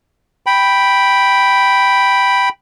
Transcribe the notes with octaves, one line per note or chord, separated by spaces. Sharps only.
G5 B5